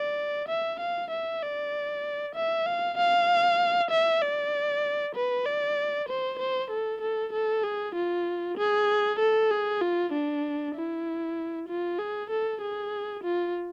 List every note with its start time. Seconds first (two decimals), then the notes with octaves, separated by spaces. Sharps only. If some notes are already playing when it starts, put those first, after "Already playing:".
Already playing: D5
0.48 E5
0.80 F5
1.11 E5
1.42 D5
2.35 E5
2.66 F5
2.97 F5
3.90 E5
4.22 D5
5.15 B4
5.46 D5
6.09 C5
6.39 C5
6.70 A4
7.01 A4
7.33 A4
7.64 G#4
7.95 F4
8.57 G#4
9.19 A4
9.50 G#4
9.81 F4
10.12 D4
10.75 E4
11.68 F4
11.99 G#4
12.30 A4
12.61 G#4
13.24 F4